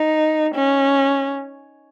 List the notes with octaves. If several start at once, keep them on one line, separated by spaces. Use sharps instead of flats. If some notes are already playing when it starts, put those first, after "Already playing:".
Already playing: D#4
C#4